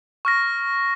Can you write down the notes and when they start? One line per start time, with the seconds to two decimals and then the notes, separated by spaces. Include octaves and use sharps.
0.25 C#6 F6 A#6